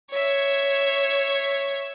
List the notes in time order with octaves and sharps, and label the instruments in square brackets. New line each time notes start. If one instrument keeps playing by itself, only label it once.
[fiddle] C#5 E5